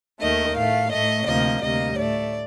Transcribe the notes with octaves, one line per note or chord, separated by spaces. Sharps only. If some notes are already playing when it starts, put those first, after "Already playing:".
D#2 D#3 A3 D#5
A2 A3 F5
A2 A3 D#5
D2 C3 F3 A#3 D#5
D2 C3 G3 A#3 D#5
A2 A3 D5